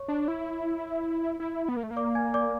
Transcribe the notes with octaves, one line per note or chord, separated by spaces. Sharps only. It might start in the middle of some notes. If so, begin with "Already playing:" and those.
Already playing: C#5 C#6
D4
E4
E4
B3
A#3
A3
A#3
D5 D6
G#5 G#6
D5 D6